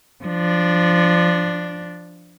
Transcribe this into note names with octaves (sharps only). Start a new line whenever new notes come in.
F3 D4